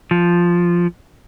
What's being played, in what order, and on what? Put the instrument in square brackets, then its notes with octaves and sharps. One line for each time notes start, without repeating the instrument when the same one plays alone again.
[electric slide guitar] F3